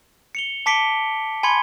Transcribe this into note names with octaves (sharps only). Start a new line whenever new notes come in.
C#7 F7 G7
A5 D6 B6 C#7 D7 G7
G#5 B5 C6 G#6 C#7 G7